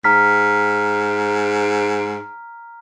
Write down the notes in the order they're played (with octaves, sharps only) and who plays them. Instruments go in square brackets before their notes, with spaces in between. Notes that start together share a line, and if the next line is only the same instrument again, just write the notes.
[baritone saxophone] G#2 [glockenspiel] A#5 F6 B6